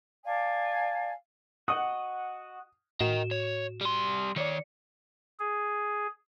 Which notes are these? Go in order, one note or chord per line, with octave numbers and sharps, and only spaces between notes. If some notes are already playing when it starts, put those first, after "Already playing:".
D5 F5 G#5 A5
F#4 D#5 F#5 D#6
A2 F#4 A#4 D#5 E7
C#5
G3 C6
D#3 C#5 D5 C#7
G#4